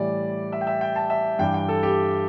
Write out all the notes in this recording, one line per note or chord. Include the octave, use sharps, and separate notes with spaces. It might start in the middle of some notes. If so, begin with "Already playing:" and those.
Already playing: A2 E3 G3 D5
E5
G5
E5
G5
A5
E5
G2 E3 G3 G5
G5
A4
G4